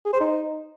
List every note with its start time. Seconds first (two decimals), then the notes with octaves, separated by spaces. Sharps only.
0.05 G#4
0.13 C5
0.20 D#4